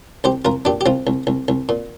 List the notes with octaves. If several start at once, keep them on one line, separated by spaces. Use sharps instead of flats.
C2 G4 C5
C2 F4 A#4
A#2 D4 G4
G4
C2 C4 F4
C2
C2
C2
A#2